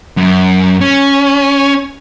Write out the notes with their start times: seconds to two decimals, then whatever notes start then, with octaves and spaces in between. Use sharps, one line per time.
0.17 F#2
0.81 C#4